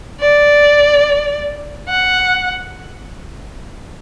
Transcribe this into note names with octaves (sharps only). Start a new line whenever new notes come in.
D5
F#5